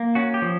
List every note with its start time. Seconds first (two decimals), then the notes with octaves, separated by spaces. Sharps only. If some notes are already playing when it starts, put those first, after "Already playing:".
Already playing: A#3
0.15 C#4 F#4
0.34 G4
0.42 F3